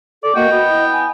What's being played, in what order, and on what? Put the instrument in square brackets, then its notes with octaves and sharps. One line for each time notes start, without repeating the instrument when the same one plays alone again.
[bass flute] A4 [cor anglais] D5
[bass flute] A#3 [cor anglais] F#4 [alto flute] D#5 [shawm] G5
[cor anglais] B3 [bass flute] F#4
[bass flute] E4
[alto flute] G#5